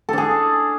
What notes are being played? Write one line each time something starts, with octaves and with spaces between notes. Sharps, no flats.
D4 G#4 A4